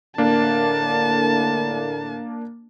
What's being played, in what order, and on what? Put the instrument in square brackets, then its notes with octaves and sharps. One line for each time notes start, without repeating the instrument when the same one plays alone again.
[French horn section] A2 D3 A#4 [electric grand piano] A#3 D4 [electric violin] A5